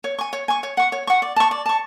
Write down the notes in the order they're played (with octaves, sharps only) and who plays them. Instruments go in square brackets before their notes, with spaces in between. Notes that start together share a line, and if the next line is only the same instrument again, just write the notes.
[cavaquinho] C#5
G#5 C#6
C#5
G#5 C#6
C#5
F#5 C#6
C#5
F#5 C#6
D5
A5 C#6
D5
A5 C#6